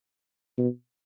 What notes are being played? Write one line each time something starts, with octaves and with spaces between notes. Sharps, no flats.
B2